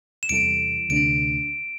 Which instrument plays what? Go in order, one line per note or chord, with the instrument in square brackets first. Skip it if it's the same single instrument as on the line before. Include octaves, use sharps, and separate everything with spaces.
[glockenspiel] E7
[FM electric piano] E2 C3 G3 E4 A4 [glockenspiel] D7
[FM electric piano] D2 C3 A3 D4 [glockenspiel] D7